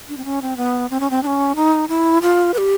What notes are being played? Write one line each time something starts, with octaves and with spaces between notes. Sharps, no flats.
D4
C4
C#4
C4
B3
C4
C#4
C4
D4
C#4
D#4
E4
F4
B4
G4